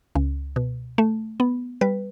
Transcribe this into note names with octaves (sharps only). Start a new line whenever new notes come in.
C#2
B2
A3
B3
G3 B4